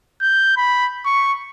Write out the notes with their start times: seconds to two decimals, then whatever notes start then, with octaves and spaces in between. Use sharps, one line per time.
0.21 G6
0.57 B5
1.06 C#6